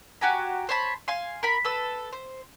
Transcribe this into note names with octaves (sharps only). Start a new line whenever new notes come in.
F#4 G4 G#5 A#5
C5 C#5 A5 B5
F5 G#5 C6
A#4 B5
A4 B4 E6
C5